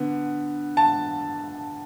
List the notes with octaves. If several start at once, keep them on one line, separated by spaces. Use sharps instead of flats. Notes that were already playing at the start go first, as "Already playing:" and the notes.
Already playing: D3 B3
A5